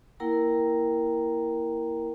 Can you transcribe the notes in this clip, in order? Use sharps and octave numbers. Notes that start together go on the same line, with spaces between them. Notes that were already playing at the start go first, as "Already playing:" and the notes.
A#3 E4 A#4 F#5 G5 A#5